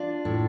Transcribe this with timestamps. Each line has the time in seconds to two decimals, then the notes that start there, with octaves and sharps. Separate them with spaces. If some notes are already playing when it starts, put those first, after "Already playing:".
Already playing: D4 F4
0.25 A2